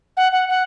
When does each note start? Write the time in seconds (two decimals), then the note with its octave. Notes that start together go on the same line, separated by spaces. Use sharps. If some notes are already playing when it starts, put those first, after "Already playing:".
0.17 F#5
0.32 F#5
0.49 F#5